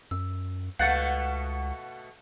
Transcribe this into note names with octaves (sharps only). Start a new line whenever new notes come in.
F#2 E6
C#2 B2 A3 F5 F#5 G6 A6 C#7